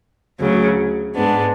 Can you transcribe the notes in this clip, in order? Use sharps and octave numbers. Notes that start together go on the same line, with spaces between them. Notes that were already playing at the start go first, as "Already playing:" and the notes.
D2 C#3 F#3
G#2 G#3 B3 D4